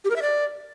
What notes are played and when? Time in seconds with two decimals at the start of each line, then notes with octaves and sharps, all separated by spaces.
0.05 G4
0.10 A#4
0.16 E5
0.22 D5